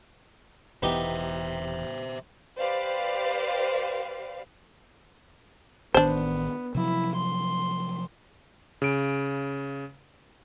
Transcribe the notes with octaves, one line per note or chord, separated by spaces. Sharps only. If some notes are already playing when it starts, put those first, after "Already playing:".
E1 E3 B3 D#4 G4 C5 E5
G4 B4 C5 D5 F5
A1 D#3 B3 D4 C5
C3 F3 F#3 E4
C6
C#3 D7